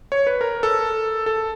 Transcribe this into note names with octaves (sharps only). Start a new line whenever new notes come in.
C#5
B4
A#4
A4
A4